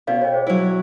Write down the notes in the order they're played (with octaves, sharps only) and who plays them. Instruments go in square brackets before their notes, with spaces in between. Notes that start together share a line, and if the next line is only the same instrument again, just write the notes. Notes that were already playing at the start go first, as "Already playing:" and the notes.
[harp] B2 [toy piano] C#4 D5 F5
[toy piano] C#5 D#5 G5
G#4 C5
[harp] F#3 E4